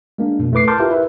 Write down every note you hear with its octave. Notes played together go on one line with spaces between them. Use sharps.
G#3 A#3 D4
F2 B2
A3 E4 B4 D6 C7
A#4 A5 C6 D6 F6 G6
E4 F4 G4 A#4 B4 E5
E4 B4 E5